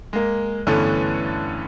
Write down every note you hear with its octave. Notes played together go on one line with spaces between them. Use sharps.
G#3 A#3
G2 D3 E3 A3 B3 C#4